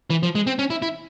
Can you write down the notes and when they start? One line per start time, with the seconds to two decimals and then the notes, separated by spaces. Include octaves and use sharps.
0.10 E3
0.23 F3
0.35 G#3
0.47 C4
0.59 C#4
0.70 E4
0.82 E4